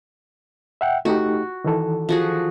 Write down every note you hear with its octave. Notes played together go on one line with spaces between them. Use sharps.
E5 F#5 G5
A3 D#4 F#4 G4
D#3 E3 A4
F3 F#4 G#4